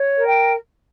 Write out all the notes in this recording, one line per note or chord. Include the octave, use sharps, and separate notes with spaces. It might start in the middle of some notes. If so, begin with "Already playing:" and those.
Already playing: C#5
A#4
G5